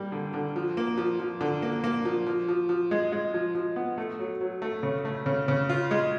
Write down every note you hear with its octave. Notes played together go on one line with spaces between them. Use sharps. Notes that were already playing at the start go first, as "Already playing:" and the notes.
Already playing: G3 A#3
D3
D3
F3
A#3
F3
F3
D3
A#3
A#3
F3
F3
F3
F3
G#3
G#3
F3
F3
B3
A3
F#3
F#3
A3
C#3
A3
C#3
C#3
F4
G#3